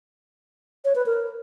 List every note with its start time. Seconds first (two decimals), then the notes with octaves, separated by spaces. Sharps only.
0.85 C#5
0.96 B4
1.06 A#4